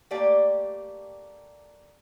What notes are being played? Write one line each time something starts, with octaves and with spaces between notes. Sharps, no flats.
A3 A#3 G4 D5